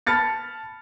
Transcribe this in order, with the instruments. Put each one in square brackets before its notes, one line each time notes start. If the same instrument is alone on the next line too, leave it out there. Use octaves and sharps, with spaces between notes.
[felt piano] A5 B5 F6 A6 C#7